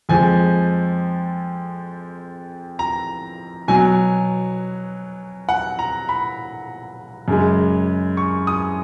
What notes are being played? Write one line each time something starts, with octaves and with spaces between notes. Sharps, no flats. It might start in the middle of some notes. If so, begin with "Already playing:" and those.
F2 F3 G#3 G#5
A#5
B2 F#3 G#5
F#5
A#5
B5
F#2 C#3 G#3
C#6
D#6